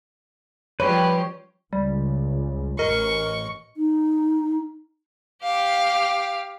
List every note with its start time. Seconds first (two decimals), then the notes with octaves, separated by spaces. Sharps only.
0.80 F3 G3 G4 B4 C#5
1.73 C#2 G3
2.79 A1 A#4 D#5 C#6
3.77 D#4
5.43 G4 F5